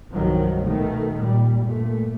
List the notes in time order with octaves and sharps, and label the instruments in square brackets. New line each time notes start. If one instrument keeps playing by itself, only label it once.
[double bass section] C2 G2 D#3 F3 F#3
B2 D#3 A3
A#2 G3
G2 A#2 A3